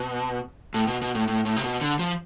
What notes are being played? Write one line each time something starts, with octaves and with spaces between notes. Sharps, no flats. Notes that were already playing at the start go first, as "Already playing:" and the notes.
Already playing: B2
A2
B2
B2
A2
A2
A2
C3
B2
D3
F3